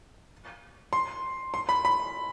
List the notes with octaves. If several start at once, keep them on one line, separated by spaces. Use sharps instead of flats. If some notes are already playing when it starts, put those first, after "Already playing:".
C6
C6
B5
B5